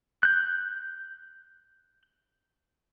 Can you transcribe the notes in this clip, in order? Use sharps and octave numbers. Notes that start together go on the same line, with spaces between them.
F#6 G6